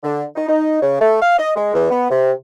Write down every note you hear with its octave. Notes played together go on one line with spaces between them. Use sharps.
D3
D#4
D#4
C#3
A3
F5
D#5
G#3
E2
B3
C3